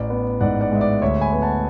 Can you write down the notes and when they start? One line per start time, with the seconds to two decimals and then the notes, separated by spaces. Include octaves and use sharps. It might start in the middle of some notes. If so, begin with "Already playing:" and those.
Already playing: A1 D5
0.10 B3
0.41 G#2 D5 F#5
0.61 D5 F#5
0.72 G#3 E5
0.81 D5
1.01 D2 C#5 E5
1.21 G#5 B5
1.33 B3
1.42 F#5 A5